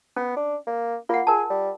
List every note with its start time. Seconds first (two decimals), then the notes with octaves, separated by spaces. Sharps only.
0.16 B3 C#4
0.36 D4
0.67 A#3
1.09 A#3 F4 F#5
1.27 G#4 A#4 A5
1.50 G3